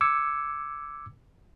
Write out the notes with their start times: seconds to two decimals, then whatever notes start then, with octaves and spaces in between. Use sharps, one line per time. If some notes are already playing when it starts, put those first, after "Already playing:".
0.01 D6 E6 G#6 C#7